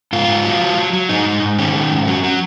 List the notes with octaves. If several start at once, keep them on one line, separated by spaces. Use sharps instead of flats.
G#2 F4
G#2
F#3
F#3
F#3
F#3
G#2 D#4
G#2
G#2
D#3 C#4
D#3
G#2
F#3
F#3